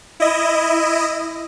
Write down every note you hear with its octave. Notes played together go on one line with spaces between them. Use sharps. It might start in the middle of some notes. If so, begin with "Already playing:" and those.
E4 D#5